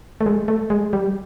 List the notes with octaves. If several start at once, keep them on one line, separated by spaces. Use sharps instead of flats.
A3
G#3
A3
G#3
G3